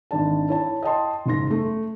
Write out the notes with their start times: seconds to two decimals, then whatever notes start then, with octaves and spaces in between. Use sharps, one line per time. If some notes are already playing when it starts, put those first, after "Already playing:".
0.11 G#1 D4 A5
0.49 E4 C#5 A5
0.83 D#5 G5 A5 C6
1.26 F#1 G#2 C6 A#6
1.51 A3